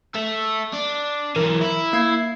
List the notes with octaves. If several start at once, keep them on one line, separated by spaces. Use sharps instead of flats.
A4 E5
D4
E3 F#3 A#4
E4
A#3 G#6 C7